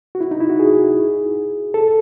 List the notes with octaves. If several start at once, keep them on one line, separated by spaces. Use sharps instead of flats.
F#4
E4
D#4
E4
F#4
G#4
A4